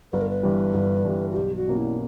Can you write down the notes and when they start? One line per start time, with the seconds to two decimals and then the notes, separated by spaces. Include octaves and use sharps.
0.13 G1 B4
0.21 A#4
0.29 B4
0.43 G2 E3 G3
0.74 G1
1.05 G2 E3 G3
1.31 F#4
1.36 B1 G4
1.56 F#4
1.67 B2 G3 A#3 C#4
1.77 E4